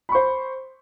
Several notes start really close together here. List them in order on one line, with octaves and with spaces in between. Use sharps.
B5 C#6 C5